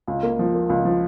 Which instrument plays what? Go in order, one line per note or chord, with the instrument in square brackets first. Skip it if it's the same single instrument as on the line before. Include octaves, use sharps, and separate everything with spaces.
[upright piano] C#2
A#3
F3
A#3
C#2
F3